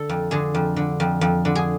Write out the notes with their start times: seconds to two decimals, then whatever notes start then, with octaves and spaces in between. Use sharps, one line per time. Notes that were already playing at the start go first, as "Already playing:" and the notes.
Already playing: D3 A4
0.09 F2
0.31 D3 G#4
0.54 F2
0.76 D3
1.00 F2
1.21 F2
1.45 D3
1.55 G#4